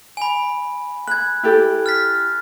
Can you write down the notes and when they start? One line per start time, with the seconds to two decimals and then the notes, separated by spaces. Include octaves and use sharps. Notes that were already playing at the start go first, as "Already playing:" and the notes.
0.17 G#5 B5
1.08 B5 F#6 G#6
1.43 E4 G4 A4
1.86 F6 A6 B6